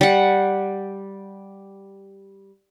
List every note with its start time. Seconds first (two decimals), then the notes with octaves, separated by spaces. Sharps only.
0.01 G3 F#5